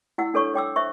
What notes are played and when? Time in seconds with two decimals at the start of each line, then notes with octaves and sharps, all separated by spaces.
0.18 E4 F#5 E6
0.34 D4 A4 C#5 C#6
0.54 C#5 G5 D6 E6
0.76 C5 E5 C#6